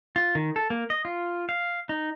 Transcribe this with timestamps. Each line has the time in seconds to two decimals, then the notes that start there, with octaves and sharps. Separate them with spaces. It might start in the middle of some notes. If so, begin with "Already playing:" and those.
0.16 F4
0.35 D#3
0.56 A4
0.70 A#3
0.90 D#5
1.05 F4
1.49 F5
1.89 D#4